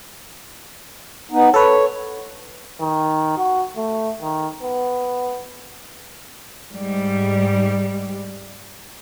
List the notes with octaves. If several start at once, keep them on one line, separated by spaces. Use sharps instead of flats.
B3 D#4
A4 B4 C#5
D#3
F#4
A3
D#3
B3
G#2 G3